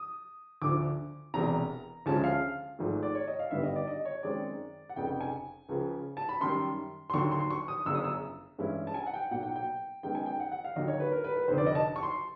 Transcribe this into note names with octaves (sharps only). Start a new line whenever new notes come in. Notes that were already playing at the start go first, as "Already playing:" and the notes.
Already playing: D#6
D2 D3 F3 D6
E1 E2 C3 A#5
D2 C#3 F3 G#3 C#4 A5
F5
G#1 G#2 F3 A3
D5
C#5
D#5
F5
G#1 G2 D3 G3 B3 E5
D#5
D5
D#5
C#5
F#2 D#3 G#3 C4 D5
F#5
F1 F2 C#3 G5
G5
G#5
C#2 C#3 F3
A5
B5
F#2 D#3 G3 C6
C6
D#2 D3 F#3 C#6
C6
C#6
D#6
G1 F#2 C#3 E6
D#6
E6
G2 E3 G#3 C#4 E4
A5
G#5
F#5
G5
B1 A#2 F#3 F#5
G5
G5
F#2 D#3 G#3 B3 D#4 G5
G#5
G5
F#5
F#5
F5
D#2 D3 F#3 D#5
C#5
B4
A#4
B4
B4
F1 F2 D3 C5
D5
D#5
A5
C#6
C6